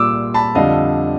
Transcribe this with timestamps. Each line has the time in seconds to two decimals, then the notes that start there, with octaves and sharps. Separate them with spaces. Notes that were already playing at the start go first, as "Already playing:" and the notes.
Already playing: A#2 G3 D6 E6
0.34 A5 B5
0.55 F2 D3 G3 D#5 F5